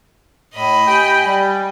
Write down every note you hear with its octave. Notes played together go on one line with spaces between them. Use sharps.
A2 D#5 B5
G4 G5 G#5
G3 G5